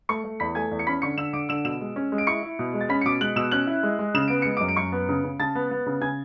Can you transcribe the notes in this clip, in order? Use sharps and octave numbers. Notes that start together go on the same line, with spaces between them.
A3 C#6 C#7
A3
E2 B5 B6
A3 G#5 G#6
E2
C#7
C#4 B5 B6
D3 C#6 C#7
D3 E6 E7
D3 D6 D7
D3 E6 E7
B2 E6 E7
G#3
C#4
G#3
D7
E4 C#6 C#7
E4
B2
G#3
A6
C#4 B5 B6
C#7
B2 D6 D7
G#3 F#6 F#7
B2 E6 E7
C#4 F#6 F#7
E4
G#3
G#3
C#3 E7
B3 D7
G#3 C#7
D6 D7
F#2
D7
F#2 C#6 C#7
B3
C#3
C#3
C#3 A5 A6
B3
B3
C#3
C#3 G#5 G#6